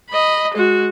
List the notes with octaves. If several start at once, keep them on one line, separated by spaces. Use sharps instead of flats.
D#5 B5
G#3 F#4